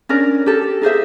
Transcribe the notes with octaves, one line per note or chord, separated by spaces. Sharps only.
C#4 D4 A#4 D5
G4 A4
D#4 G#4 C5 E5